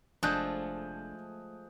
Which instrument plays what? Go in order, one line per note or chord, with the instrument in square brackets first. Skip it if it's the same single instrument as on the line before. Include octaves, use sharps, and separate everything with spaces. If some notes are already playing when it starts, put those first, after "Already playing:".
[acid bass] F1 [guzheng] F3 G#3 A3 [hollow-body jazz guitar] D4 [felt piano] D#6 F#6 G6